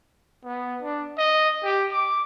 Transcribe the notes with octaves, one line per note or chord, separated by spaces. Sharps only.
B3
D4
D#5
G4
D6